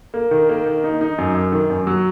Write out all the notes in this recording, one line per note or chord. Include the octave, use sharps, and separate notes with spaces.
A#3
D#3
A#3
D#3
D#4
D#4
F#2
F#2
D#3
F#2
F#3